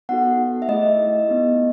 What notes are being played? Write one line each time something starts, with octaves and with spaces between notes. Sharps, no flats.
B3 D#4 F#4 A4 F#5
E5
A3 E4 G#4 D#5
B3 D#4 G#4